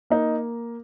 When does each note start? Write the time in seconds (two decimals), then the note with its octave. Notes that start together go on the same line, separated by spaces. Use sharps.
0.10 A#3 D#4